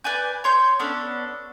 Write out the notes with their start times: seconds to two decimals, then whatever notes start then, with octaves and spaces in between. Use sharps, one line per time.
0.04 B4 D5 G#5 G6
0.44 C#5 C6 G6
0.79 B3 C#4 D4 A4